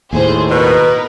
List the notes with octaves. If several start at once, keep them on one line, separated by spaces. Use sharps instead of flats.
D#2 A2 G#4 C5
B2 A#4 B4